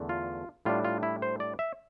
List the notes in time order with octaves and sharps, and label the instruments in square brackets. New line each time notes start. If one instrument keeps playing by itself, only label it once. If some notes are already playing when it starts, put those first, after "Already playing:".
Already playing: [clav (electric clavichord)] E2 D3 A3 D4
F4
A2 G3 D4 F4
F4
E4
C5
D5
E5